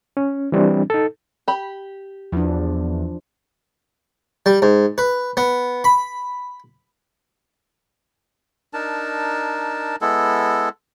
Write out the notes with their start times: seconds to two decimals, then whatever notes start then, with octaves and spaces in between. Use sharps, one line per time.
0.17 C#4
0.52 E3 G3 C4 D4
0.90 D#4 A4
1.48 G4 B5
2.32 E2 F3 D4
4.46 G3
4.62 G#2
4.98 B4
5.37 B3
5.84 B5
8.73 D4 D#4 A#4 A5
10.01 G#3 B3 E4 A4